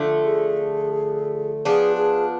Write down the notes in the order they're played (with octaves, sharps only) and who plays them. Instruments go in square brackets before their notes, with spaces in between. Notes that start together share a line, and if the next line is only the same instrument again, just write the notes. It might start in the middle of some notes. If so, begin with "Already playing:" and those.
Already playing: [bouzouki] D3 F3 A3
[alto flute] G#4
[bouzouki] F3 B3 D4 [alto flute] G#4
[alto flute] G#4